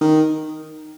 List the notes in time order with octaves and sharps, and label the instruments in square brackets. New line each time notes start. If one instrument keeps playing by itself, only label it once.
[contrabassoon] D#3